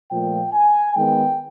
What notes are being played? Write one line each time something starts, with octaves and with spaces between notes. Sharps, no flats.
A#2 F3 A3 G5
G#5
D#3 G#3 B3 G5